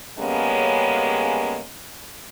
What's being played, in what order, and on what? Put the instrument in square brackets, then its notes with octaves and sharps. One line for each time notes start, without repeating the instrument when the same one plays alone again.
[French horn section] C#3 G3 G#3 A#3 B3 C#4